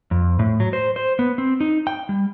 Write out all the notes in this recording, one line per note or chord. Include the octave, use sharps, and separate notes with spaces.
F2
A2
F#3
C5
C5
B3
C4
D#4
G5
G3